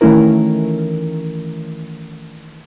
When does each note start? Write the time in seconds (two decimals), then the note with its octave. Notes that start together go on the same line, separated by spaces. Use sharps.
0.01 D#3 E3 A3 C#4 E4 A#4